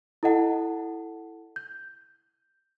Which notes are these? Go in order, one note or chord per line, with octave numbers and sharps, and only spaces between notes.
E4 A4 D#5 F#5 A5
G6